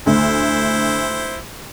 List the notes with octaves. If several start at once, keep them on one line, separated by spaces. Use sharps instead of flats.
D2 E4 C5